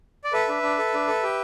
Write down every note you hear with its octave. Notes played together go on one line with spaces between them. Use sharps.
D5
A4 B4 E5
D4
D4
A4
D4
A4
G4